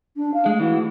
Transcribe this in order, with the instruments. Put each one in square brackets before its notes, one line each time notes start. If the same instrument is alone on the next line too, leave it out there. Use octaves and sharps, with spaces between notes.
[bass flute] D4
F5
[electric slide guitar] G#3 [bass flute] A3
[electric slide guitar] E3 F#4